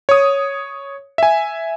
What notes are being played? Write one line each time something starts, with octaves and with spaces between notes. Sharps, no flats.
C#5 D#6
E5 G#5